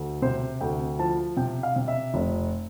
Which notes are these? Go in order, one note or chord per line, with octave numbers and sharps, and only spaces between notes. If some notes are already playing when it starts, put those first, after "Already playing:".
Already playing: D2
C3 C5
D2 G5
F3 A5
C3 G5
F5
C3
E5
F1